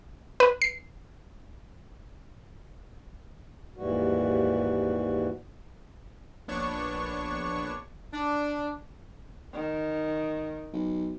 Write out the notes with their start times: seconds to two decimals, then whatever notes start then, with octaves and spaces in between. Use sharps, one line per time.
0.40 B4
0.62 C7
3.77 D#2 G#2 E3 G3 F#4
6.48 A#1 B3 D4 C#5 C#6
8.14 D4
9.54 D#3
10.73 B1